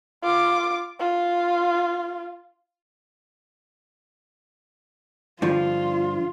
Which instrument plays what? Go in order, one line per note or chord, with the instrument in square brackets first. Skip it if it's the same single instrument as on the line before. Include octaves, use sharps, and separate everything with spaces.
[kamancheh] F4 D6
F4
[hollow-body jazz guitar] G2 D3 F3 [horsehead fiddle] F4